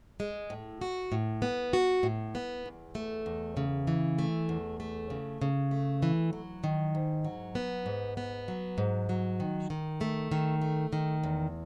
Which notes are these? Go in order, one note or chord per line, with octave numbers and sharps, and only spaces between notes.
G#3
A2
F#4
A2
B3
F#4
A2
B3
E2
A3
E2
C#3
E3
A3
E2
A3
C#3
C#3
A3
E3
F#3
D#3
G#2
F#3
B3
G#2
B3
F#3
G#2
F#3
D#3
D#3
A3
D#3
A3
D#3
E2